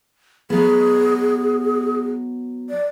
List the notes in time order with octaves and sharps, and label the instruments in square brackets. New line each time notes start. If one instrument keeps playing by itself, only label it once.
[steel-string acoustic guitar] F#3 B3 [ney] G#4
[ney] D5